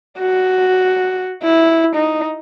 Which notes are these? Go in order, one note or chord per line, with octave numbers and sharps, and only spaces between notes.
F#4
E4
D#4